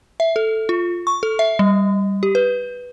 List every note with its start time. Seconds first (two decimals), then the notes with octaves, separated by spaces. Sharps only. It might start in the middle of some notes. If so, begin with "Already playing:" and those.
0.20 E5
0.36 A4
0.69 F4
1.07 C#6
1.23 A4
1.39 E5
1.59 G3
2.23 G4
2.35 B4